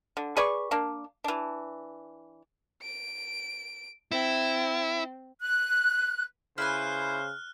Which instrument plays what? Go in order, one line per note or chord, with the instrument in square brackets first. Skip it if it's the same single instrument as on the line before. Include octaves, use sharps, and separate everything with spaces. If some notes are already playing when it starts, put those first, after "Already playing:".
[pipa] D3
G#4 B4 D5 C#6
A#3 D4
E3 D4
[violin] D7
[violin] C4 [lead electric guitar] E4
[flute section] F#6
[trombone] C#3 [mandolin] E4 B4 G#5 [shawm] C5 [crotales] F6 F#6